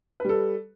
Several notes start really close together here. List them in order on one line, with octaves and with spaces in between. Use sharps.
B4 G3 A4